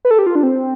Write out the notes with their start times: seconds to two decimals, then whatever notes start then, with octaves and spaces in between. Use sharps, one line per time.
0.05 B4
0.11 A4
0.19 G4
0.26 F4
0.35 D4
0.43 C4